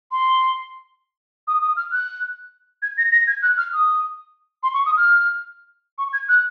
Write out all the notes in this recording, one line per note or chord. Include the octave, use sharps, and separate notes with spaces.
C6
D#6
D#6
F6
F#6
G#6
A#6
A#6
G#6
F#6
F6
D#6
C6
C#6
D#6
F6
C#6
G#6
F#6